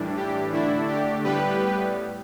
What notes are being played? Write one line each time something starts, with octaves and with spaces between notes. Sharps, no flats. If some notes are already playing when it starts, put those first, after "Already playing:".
Already playing: A2 E3 G3 D4
G4
D3 A3 D4 E4
G4
A2 G3 B3 G4 B4